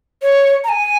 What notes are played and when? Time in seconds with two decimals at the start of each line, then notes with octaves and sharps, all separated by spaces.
0.22 C#5
0.64 A#5
0.69 G#5